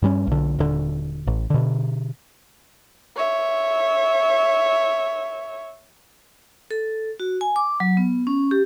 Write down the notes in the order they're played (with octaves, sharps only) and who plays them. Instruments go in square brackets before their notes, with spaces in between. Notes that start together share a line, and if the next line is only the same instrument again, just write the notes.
[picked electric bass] G2 G3 C#4
B1 D3
D#1 D3
A1
B2 D3
[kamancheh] C#5 E5
[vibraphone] A4
F#4
G#5
D6
F#3
B3
C#4
G4